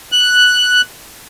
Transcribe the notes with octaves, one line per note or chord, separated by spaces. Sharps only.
F#6